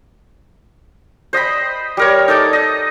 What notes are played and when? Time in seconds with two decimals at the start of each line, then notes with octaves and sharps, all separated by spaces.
1.33 C5 D#5 G5 B5
1.97 G3 A#4 C#5
2.28 D#4 A4 D5 G5
2.53 D#5